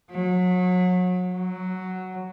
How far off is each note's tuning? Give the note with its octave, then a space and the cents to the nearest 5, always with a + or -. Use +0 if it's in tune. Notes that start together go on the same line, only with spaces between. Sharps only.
F#3 -30
F#3 +5